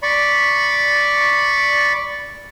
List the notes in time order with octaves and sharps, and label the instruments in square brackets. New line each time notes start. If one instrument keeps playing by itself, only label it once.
[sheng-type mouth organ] D5 B5 C#6